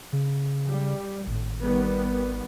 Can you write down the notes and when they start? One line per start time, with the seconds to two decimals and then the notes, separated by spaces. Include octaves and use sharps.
0.13 C#3
0.68 G3
1.27 G#1 A2
1.63 D#3 G3 B3